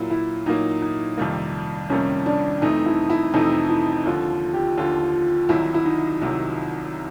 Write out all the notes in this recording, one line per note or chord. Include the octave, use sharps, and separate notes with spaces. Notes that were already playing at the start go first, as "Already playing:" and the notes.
Already playing: A#2 F#3 A#3 E4
E4
A#2 F#3 A#3 D#4
D#4
F2 C3 D#3 G3 A#3
F2 C3 D#3 G3 A#3 C#4
D4
F2 C3 E3 A3 C4 D#4
E4
E4
F2 C3 E3 A3 C4 D#4
E4
D#2 D3 F3 F4
G4
D#2 D3 F3 F4
C2 C3 D#3 F#3 E4
E4
D#4
C2 C3 D#3 F#3